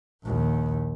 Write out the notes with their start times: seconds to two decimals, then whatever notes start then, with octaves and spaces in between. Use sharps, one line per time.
0.24 A#1 D#2